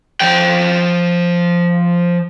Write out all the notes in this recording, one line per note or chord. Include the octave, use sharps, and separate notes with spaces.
F3 G5